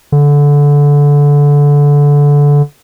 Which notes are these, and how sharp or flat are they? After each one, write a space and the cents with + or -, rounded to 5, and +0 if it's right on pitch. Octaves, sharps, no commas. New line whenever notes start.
D3 -20